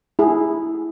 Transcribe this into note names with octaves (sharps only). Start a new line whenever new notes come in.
E4 G#4